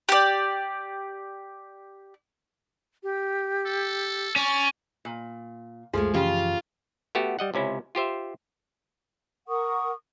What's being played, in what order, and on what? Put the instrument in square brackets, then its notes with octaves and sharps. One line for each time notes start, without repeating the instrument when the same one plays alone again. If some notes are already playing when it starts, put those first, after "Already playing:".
[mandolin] G4 D5
[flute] G4
[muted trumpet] A4
[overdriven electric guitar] C#4 [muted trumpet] D5
[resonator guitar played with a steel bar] A#2
[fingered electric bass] C#2 F#2 [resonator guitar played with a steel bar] F3 [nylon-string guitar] G#3 A3 G#4
[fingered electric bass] F#2 E3 F3 [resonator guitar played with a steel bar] C#3 [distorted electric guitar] F4 [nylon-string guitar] G4
[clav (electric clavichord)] A3 B3 F#4 G4
G3 D#5 F#5
C#2 C3 C#4 E4
F4 G4 C5 E5
[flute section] A#4 F#5 C#6 D#6